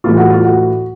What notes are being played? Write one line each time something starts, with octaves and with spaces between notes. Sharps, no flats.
A2 E3 G3 F4
F#4
F4
F#4